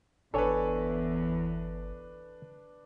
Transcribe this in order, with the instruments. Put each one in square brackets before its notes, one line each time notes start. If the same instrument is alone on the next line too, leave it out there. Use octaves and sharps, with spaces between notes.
[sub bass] G1 [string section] E2 [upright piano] D4 B4 [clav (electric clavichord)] A4 C#5 G#5